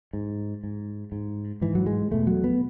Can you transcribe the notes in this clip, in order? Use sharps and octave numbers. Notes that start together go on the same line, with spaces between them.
G#2
G#2
G#2
G#2 E3
F#3
G#3
E2 B2 A3
F#3
B3